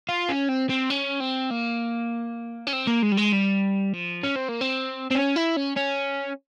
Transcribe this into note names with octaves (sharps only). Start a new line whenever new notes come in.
F4
C#4
C4
C4
C#4
C4
A#3
C#4
C4
A#3
G#3
G3
G#3
G3
F3
C#4
C4
A#3
C4
C4
C#4
E4
C#4
C#4